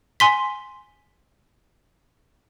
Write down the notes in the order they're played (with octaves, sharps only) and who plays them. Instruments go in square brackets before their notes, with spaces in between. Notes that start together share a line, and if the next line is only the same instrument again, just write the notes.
[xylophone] G#5 C6 B6